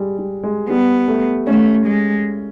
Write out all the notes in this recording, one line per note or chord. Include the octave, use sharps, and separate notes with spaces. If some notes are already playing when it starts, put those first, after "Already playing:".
Already playing: G3 G#3
G3
G#3
G3 B3
A3
A3 C#4
G#3